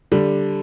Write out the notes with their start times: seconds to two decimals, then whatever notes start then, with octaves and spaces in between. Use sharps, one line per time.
0.12 D3 G3